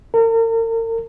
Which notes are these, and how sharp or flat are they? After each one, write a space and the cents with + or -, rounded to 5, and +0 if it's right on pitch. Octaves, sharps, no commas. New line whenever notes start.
A#4 -40